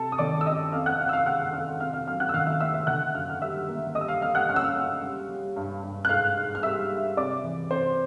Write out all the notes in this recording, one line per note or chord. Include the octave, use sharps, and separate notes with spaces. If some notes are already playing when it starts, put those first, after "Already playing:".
Already playing: C3 A4 A5
D#6
D#3 D5 D6
E6
C#4 D#5 D#6
F2 F5 F6
F#5 F#6
F2 F5 F6
E6
F5 F6
C#3 F#5 F#6
F2 F5 F6
C3 F5 F6
F5 F6
F#3 F5 F6
F#5 F#6
E6
D#3 F5 F6
E5 E6
A3 E5 E6
E5 E6
D3 F#5 F#6
F#2 F5 F6
F6
G3 E5 E6
A#3
G3 D#5 D#6
E6
F5 F6
G3 F5 F6
F#5 F#6
C#4 F6
E6
F5 F6
C#4
G3
G3
G2
G2
F#6
G#2 F5 F6
G#2
F6
G3 E5 E6
G3
C3 D5 D6
E3
C3 C5 C6